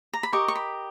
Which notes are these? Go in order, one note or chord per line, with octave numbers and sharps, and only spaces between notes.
A#5
B5
G4 A#4 D#5 C#6
C#6
B5